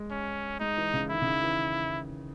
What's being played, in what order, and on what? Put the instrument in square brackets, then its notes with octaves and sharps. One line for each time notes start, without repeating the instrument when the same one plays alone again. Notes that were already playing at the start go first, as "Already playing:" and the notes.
Already playing: [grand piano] G#3
[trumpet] C#4
[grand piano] G#3 [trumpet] D#4
[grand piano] E3
C#3
[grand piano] D#3 [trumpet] E4
[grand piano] C#3
D#3
E3